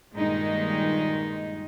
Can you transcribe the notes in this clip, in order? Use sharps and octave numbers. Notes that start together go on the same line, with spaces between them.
G2 A#2 D#3 G#3 D#4 D#5